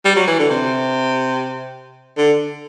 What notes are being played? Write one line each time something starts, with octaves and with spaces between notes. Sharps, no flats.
G3
F#3
E3
D3
C3
D3